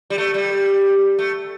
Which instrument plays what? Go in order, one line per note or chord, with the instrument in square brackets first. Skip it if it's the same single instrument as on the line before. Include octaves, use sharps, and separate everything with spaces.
[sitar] G3
A3
G3
A3